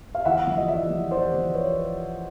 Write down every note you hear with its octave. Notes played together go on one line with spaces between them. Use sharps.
F5
E2 E5 F#5
F3
D#5
E2 D5 E5
F3
E2 C5 D5
F3
B4 C#5